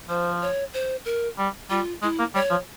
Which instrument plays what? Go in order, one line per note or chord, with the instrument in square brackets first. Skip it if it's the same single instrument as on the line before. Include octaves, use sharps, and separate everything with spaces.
[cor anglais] F3 [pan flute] C5
[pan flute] C#5
C5
A#4
[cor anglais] G3
[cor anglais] G3 [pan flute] F4
[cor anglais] G#3 [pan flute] E4
[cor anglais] A#3
[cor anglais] G3 [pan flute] C#5
[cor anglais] F3